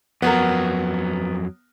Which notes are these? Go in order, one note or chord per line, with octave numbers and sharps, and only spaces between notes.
F2 F#3 B3 A#4